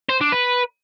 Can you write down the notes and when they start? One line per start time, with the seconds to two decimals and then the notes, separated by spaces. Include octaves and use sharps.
0.09 C5
0.21 D4
0.32 B4